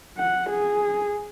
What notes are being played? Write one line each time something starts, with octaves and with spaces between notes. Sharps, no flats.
F#5
G#4